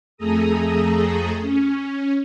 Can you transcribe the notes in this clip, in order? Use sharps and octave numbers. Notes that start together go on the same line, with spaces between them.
F2 A3 G#4 A4 A#5 D#6
C#4